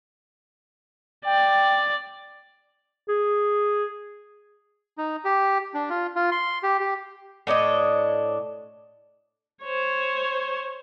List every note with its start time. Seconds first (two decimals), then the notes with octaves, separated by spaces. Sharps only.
1.26 D5 G5
3.09 G#4
4.98 D#4
5.25 G4
5.74 D4
5.90 F4
6.16 F4
6.32 C6
6.63 G4
6.80 G4
7.47 A2 D4 C#5 D#5
9.63 C5 C#5